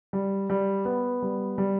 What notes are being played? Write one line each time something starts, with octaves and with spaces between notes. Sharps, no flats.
G3
G3
B3
G3
G3